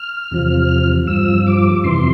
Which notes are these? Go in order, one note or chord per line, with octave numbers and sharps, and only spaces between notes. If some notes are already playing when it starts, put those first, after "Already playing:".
Already playing: F6
E2 C3 F3
G2 F3 E6
D6
F2 C3 E3 C6